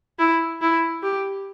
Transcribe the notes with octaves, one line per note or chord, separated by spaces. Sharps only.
E4
E4
G4